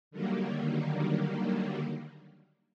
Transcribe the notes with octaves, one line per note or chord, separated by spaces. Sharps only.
D3 D#3 F#3 G3 A#3